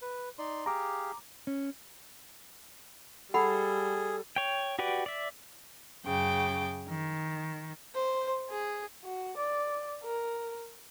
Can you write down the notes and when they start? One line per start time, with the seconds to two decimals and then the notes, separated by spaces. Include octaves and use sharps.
0.02 B4
0.38 D#4 D5 C6
0.66 G4 G#4 F5 A#5 D6
1.47 C#4
3.34 G3 G#4 A4 F#5 B5
4.36 C#5 G5
4.79 F#4 G4 B4 D5
5.06 D5 E5
6.05 F#2 C#3 G5 D6
6.88 D#3
7.95 C5
8.50 G#4
9.04 F#4
9.37 D5
10.03 A#4